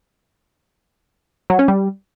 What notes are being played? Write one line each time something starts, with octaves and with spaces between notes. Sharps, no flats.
F#3
C#4
G3